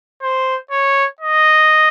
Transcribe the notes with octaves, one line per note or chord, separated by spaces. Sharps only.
C5
C#5
D#5